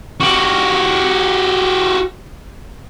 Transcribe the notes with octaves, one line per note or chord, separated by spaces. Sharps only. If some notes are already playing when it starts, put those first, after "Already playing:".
F#4 G4